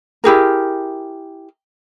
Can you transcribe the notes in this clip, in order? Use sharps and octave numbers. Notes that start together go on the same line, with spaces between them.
E4 G4 G#4 A#4